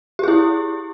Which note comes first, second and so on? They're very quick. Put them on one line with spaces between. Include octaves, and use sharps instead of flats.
G4 G#4 E4